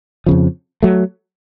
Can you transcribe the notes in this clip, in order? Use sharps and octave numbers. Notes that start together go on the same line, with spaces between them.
F2 C#3 F3
F#3 A3